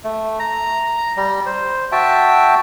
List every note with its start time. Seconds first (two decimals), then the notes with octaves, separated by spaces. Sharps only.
0.04 A3
0.39 A#5
1.17 G3
1.46 C5
1.92 F#4 E5 G5 A5